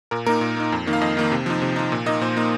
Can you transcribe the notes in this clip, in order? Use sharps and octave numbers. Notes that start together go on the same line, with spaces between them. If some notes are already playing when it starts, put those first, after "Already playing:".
A#2 A#4
A#3 D#4 A#4
A#2
A#3 D#4
F2
D#3 A#3 D#4
F5
F2 D#5
D#3 A#3 D#4
C3
F3 D#4
C3
F3 D#4
A#2
A#3 D#4 D#5
A#2 C5
A#3 D#4